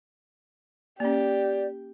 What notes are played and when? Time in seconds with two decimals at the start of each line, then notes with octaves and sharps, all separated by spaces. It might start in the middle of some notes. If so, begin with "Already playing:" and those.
1.00 A#3 C#4 G4 D5